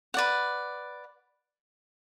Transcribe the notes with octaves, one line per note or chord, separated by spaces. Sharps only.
B4 D5 F#5